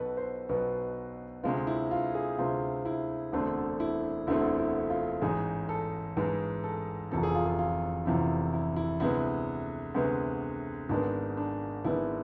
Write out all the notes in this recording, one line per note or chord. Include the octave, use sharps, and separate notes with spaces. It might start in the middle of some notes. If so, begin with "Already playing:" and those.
Already playing: B1 B2 B3 A4 B4
C5
B1 B2 B3
D2 C3 G#3 C4 F4
E4
F4
G#4
D2 C3 G#3 C4 F4
E4
E1 D2 D3 A3 C4 D4
E4
E1 D2 D3 A3 C4 E4
E4
F4
A1 G#2 G#3 G#4
A4
A1 G#2 G#3 B4
A4
F1 E2 C3 F3 A4
G#4
F4
G#4
F4
F1 E2 C3 F3 E4
E4
E4
D2 C3 G#3 B3 E4
D2 C3 G#3 B3
G#1 G#2 G#3 B3 D4
D4
G#1 G#2 G#3 B3 E4